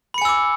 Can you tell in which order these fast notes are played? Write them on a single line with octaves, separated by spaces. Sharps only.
B5 C#7 G#5 E6 D6